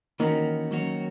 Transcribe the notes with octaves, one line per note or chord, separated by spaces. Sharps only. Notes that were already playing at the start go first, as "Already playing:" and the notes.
D#3 E3 A#3 C#4 F#4
F#3 A#3 C#4 F#4 C#5